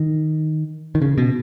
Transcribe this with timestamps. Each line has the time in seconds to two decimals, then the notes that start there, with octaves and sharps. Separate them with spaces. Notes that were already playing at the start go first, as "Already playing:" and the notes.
Already playing: D#3
0.95 D#3
1.02 C#3
1.18 B2